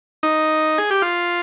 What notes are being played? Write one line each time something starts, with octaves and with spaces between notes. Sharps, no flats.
D#4
G#4
G4
F4